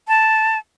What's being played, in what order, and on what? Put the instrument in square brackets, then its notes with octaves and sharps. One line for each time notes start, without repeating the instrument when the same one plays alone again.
[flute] A5